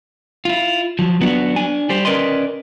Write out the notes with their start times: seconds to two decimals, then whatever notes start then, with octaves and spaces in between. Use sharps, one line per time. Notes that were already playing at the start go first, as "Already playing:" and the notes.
0.45 E4 F4
0.99 F3 F#3
1.21 F#3 B3 D4 F#4
1.56 D4 G#5
1.89 G3 G4 C5
2.05 C#4 A#4 B4 D5 D#5 C6